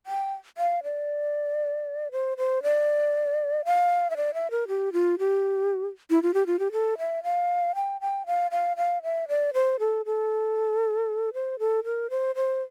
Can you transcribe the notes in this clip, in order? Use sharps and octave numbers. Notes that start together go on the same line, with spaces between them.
G5
F5
D5
C5
C5
D5
F5
E5
D5
E5
A#4
G4
F4
G4
E4
F4
G4
F4
G4
A4
E5
F5
G5
G5
F5
F5
F5
E5
D5
C5
A4
A4
C5
A4
A#4
C5
C5